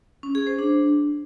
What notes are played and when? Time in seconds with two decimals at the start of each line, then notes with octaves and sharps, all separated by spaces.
0.23 C#4
0.35 G#4
0.47 C5
0.59 D4